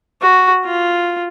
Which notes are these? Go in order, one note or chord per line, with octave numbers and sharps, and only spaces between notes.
F#4
F4